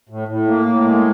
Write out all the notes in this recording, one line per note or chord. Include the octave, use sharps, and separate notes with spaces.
A2
A2
A#3
A2
G#3